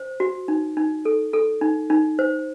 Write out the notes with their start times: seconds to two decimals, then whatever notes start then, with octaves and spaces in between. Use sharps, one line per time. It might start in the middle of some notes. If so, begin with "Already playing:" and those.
Already playing: C5
0.20 F#4
0.48 D#4
0.77 D#4
1.05 A4
1.33 A4
1.61 D#4
1.90 D#4
2.19 C5